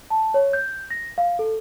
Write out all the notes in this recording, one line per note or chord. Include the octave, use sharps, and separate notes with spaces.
A5
C#5
G6
A#6
F5
A4